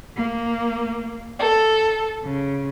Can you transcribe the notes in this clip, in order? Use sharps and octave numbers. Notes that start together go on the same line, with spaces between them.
A#3
A4
C#3